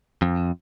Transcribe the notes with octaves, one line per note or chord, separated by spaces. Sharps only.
F2